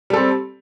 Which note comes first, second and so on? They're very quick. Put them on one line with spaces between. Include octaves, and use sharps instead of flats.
G3 A4 C4